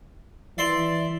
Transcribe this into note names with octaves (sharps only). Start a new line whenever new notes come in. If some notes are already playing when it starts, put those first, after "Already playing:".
E3 D5 E5 C6